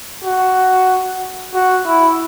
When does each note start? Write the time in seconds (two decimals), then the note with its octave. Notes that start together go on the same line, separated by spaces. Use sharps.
0.24 F#4
1.54 F#4
1.87 E4